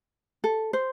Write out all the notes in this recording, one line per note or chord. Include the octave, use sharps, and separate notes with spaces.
A4
C5